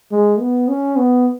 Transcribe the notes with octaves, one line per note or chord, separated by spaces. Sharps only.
G#3
B3
C#4
B3